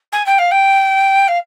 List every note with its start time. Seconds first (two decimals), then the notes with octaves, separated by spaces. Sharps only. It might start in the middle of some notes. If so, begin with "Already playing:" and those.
0.12 G#5
0.26 G5
0.38 F5
0.51 G5
1.28 F5